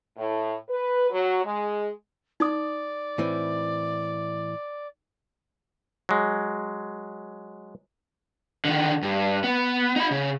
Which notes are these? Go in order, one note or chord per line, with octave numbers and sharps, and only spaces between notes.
A2
B4
F#3
G#3
D#4 D5 D#6
A2 E3 C4
F#3 G#3
D3 D#3
G2
B3
D#4 B5
C#3